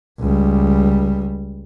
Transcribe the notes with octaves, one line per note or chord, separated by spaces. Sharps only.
C#2 G3